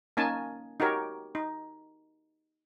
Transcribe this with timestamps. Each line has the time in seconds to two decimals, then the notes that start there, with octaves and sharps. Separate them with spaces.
0.17 A#3 C#4 D#4 G#5 A5
0.80 D#4 F#4 G4 A#4 C#5
1.35 D#4